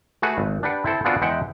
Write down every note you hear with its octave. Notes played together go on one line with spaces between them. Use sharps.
A3 F#4 G#4 B4
G#1
D4 G4 B4 F#5
C4 E4 A4 C5
B3 C4 D4 F4 F#4 G#4
E2 G#3 E5 F#5 G5